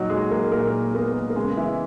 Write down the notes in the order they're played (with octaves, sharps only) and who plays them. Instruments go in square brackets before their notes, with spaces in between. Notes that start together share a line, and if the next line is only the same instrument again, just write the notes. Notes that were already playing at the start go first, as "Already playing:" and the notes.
Already playing: [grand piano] A#2 F#3 D#4 F#4
G#3 G#4
A#3 A#4
A#2 A#3 A#4
A#3 B3 A#4
A#4
C#3 G#3 G#4
E3 E4